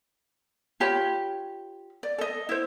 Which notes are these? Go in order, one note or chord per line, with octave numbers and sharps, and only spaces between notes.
F4 G4 C#5 B5
D5
A4 D#5
E4 C5